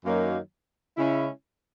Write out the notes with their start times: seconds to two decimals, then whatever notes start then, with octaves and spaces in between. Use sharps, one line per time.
0.05 F#2 D#3 F#3 A#3
0.97 C#3 G#3 C#4 E4